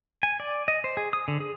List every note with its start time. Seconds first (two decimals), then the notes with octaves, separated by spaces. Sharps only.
0.23 G#5
0.40 D5
0.68 D#5
0.84 C5
0.97 G#4
1.13 D#6
1.28 D3
1.40 G#4